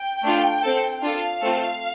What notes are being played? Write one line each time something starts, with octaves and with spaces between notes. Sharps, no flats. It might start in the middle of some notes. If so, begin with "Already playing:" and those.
Already playing: G5
A3 D4 F4
C4 A4
D4 F4 A4 F5
A3 C4 F4 A4